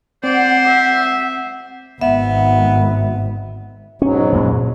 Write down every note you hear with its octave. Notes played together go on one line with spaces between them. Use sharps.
C4 C5 D5 F#5
E5
G#1 B3 E5
G#2 B2 F#3 C#4
F2 A#2